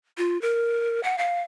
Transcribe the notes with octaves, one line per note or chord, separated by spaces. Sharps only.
F4
A#4
F#5
F5